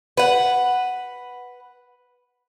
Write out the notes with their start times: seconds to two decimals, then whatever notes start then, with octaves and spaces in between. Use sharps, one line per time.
0.17 B4 F#5